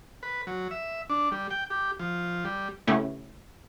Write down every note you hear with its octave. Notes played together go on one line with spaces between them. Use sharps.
B4
F#3
E5
D4
G3
G5
G4
F3
G3
C#3 A3 B3 C#4 E4 G4